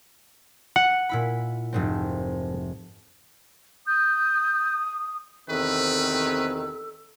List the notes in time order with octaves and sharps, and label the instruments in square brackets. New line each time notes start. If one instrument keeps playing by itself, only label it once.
[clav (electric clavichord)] F#5
[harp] A#2 E4 B5
F1 G#2 C4
[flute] D#6 [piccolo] G6
[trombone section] E2 C3 D#3 [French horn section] C4 [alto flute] A4 [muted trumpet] B4